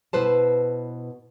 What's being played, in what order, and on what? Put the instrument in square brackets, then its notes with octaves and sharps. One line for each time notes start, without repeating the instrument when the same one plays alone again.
[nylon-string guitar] B2 E4 B4 C5 A5